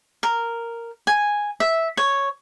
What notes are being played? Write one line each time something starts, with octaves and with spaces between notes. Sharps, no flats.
A#4
G#5
E5
C#5